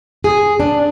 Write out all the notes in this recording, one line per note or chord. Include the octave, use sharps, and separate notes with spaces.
G#4
D4